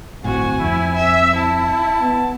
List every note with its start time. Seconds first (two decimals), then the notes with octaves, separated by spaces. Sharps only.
0.24 D1 G1 A2 C4 F#4 G#5
0.60 F2 C4 E4
0.95 E5
1.36 E4 A5
2.00 B3